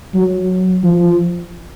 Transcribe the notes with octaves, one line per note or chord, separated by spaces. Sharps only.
F#3
F3